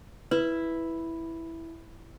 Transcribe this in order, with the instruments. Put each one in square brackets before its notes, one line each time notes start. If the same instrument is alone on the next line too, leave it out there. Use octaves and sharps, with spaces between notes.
[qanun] E4 [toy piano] B4